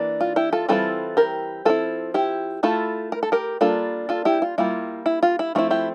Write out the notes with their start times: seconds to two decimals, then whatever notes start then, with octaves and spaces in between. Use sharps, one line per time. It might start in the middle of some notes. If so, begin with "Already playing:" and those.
Already playing: E3 A#3 D4
0.20 F4
0.36 E4 G4
0.53 F4 A4
0.68 E3 G3 C4 E4 F4 A4
1.17 G4 A#4
1.65 F3 C4 E4 F4 A4
2.14 E4 G4
2.63 A3 E4 F4 A4
3.12 A#4
3.23 A4
3.32 G4 A#4
3.61 G3 A#3 D4 F4 A4
4.09 F4 A4
4.25 E4 G4
4.42 F4
4.58 G3 A#3 E4 F4
5.06 E4
5.23 F4
5.39 E4
5.55 F3 A3 C4 E4 F4
5.70 E4 G4